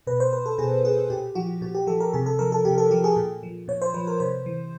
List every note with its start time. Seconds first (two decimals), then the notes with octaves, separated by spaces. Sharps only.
0.07 B2 B4
0.20 C5
0.33 B4
0.46 A4
0.58 B2 G#4
0.85 G#4
1.10 A#2 G4
1.35 F3 F#4
1.61 A#2 F#4
1.75 G4
1.87 F3 A4
2.00 A#4
2.13 C3 G#4
2.26 A4
2.39 F3 A#4
2.52 A4
2.65 C3 G4
2.78 A4
2.91 F3 G4
3.04 G#4
3.16 A#2
3.43 F3
3.68 A#2 C#5
3.82 C5
3.94 F3 B4
4.07 A#4
4.20 C3 C5
4.46 E3